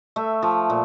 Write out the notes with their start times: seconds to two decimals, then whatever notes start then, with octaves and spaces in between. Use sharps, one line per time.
0.16 A3 E5
0.42 F3
0.70 A#2